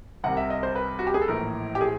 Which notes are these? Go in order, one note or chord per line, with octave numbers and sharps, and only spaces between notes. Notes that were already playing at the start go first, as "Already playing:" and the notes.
C2 C3 D#3 F#5
E5
D#5
C5
B4
F#4
G4
G#4
A4
A#1 A2 E3 A#4
G4
G#4